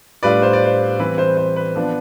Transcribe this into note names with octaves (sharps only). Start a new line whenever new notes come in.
A2 G3 D4 F4 B4 D5
C5
D5
C5
E3 G3 C4 B4
C5
C5
B4
F3 B3 D4